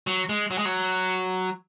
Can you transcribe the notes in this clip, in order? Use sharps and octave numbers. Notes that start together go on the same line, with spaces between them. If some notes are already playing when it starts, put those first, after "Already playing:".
F#3
G#3
F#3
G#3
F#3